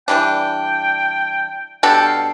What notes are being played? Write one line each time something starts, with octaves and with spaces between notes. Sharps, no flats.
E3 G3 D4 G5
B2 G3 D4 A4 G5
F5